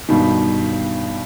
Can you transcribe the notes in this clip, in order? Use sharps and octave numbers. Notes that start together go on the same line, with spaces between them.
G2 B2 D#3